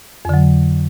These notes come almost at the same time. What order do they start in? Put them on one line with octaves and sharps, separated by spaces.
F2 D3 F#3